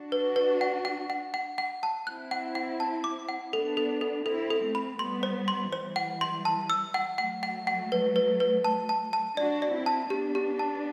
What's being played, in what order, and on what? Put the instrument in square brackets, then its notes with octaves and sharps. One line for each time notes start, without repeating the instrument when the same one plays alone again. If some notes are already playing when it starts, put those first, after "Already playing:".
Already playing: [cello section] D4 F#4
[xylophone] B4
B4
F#5
F#5
F#5
F#5
F#5
A5
[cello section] C4 E4 [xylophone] F#6
[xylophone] F#5
F#5
A5
D6
F#5
[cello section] B3 D4 [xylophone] A4
[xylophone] A4
A4
[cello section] C4 E4 [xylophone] A4
[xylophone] A4
[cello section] A3 C4
[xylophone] B5
[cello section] G3 B3 [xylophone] C6
[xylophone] C5
C6
[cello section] E3 G3 [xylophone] C5
[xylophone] F#5
C6
A5
E6
F#5
[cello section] F#3 A3 [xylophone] F#5
[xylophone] F#5
F#5
B4
B4
B4
A5
A5
A5
[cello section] D4 F#4 [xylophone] D5
[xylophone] D5
[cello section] C4 E4
[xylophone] A5
[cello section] B3 D4 [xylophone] G4
[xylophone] G4
A5